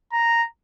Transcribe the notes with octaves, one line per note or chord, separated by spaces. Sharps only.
A#5